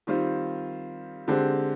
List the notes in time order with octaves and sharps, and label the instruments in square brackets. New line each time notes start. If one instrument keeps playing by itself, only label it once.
[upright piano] D#3 G3 C4 F4
D3 G#3 C4 G4